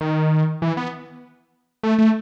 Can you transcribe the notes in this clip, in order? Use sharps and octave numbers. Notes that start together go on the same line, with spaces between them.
D#3
E3
B3
A3
A3